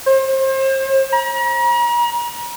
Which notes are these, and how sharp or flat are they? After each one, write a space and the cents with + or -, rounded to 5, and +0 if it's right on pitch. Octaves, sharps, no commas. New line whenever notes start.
C5 +35
A#5 +40